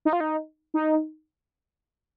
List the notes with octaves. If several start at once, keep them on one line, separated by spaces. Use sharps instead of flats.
D#4
F4
D#4
D#4